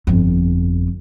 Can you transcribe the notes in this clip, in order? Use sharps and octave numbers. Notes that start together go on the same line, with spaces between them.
G1 F2